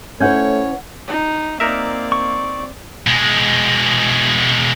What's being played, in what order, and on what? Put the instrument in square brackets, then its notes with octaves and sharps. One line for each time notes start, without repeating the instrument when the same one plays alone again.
[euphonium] A3 [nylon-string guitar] C#4 E4 C5 [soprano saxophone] C#5 [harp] F#5 G6 G#6
[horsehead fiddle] D#4
[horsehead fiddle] A#3 [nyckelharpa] C4 D5 [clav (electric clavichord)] D#4 A#4 E5
[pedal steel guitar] C#6
[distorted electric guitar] B2 G#3